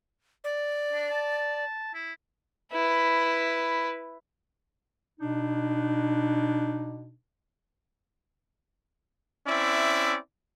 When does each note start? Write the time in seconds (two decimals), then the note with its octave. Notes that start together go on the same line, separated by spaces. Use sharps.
0.44 D5
0.93 D4
1.10 A5
1.94 E4
2.73 E4 B4
5.19 B2 D4 D#4
9.47 C4 C#4 E4 D5 E5